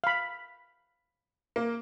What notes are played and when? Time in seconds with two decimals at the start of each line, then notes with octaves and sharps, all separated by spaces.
0.04 F5 B5
1.56 A#3